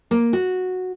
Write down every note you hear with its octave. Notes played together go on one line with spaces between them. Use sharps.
A#3
F#4